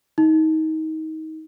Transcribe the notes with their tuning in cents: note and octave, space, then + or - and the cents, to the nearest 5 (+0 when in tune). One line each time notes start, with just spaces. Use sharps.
D#4 +25